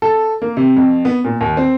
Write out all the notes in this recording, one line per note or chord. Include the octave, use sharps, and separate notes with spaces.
A4
A#3
C3
F2
B3
A#2
D#2
C4